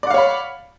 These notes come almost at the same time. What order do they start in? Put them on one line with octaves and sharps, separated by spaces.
D5 F#5 F5 C#5 B5